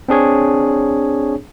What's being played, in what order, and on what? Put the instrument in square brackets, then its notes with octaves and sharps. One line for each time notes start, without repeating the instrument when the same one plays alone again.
[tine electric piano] C4 D4 G#4 C#5